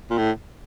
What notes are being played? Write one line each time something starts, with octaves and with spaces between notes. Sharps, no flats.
A#2
A2